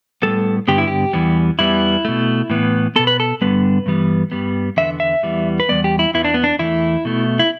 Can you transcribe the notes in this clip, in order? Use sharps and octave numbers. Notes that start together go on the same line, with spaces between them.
A2 G3 B3 A4
G2 D3 B3 G4
E4
G4
E2 E3 G3 B3
E2 E3 G3 B3 E4
B2 A3
A2 E3 B3
B2 B3 A4
B4
A4
G2 D3 G3 B3 B4
G2 E3 G3 B3
G2 G3 B3
E2 D3 B3 E5
E5
E2 E3 G3 B3
B4
E2 B2 G3 B3 D5
G4
E4
E2 E3 B3 E4
D4
B3
D4
E2 E3 A3 E4
B2 A3
E4